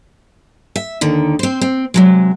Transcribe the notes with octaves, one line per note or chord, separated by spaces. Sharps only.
E5
D#2 D3 D#3
C4 C5
C4
C3 F#3 G#3